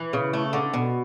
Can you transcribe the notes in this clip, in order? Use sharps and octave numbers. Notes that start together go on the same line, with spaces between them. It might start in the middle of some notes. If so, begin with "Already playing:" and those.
Already playing: E3
C#3
A3
D3
B2